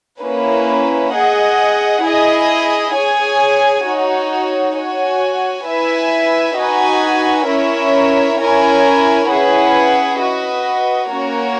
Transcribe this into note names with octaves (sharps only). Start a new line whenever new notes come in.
A#3 C#4 E4 B4
G#4 D#5 F#5
E4 G#4 D#5
G#4 C#5 G#5
D#4 F#4 C#5
F#4 C#5 G#5
E4 B4 E5 G#5
D#4 F#4 B4 D#5 G#5
C#4 E4 A#4 C#5 E5
C#4 E4 A#4 C#5 G#5
C#4 E4 G#4 B4 F#5
F#4 B4 D#5
A#3 C#4 F#4 A#4 C#5